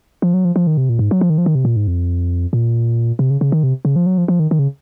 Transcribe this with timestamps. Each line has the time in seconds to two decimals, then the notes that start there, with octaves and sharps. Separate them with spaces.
0.22 F3
0.34 F#3
0.45 F3
0.56 F3
0.67 D#3
0.77 C3
0.89 A#2
0.99 G#2
1.11 F#3
1.21 F3
1.30 D#3
1.38 F3
1.46 D#3
1.55 C3
1.65 A#2
1.76 G#2
1.87 F2
2.53 A#2
3.19 C3
3.30 C#3
3.41 C#3
3.52 D#3
3.63 C3
3.85 C#3
3.96 F3
4.06 F#3
4.18 F3
4.28 F3
4.40 D#3
4.51 D#3
4.59 C#3